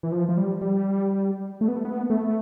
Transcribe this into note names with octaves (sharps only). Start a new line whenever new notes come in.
E3
F3
F3
G3
G3
A3
B3
A3
B3
A3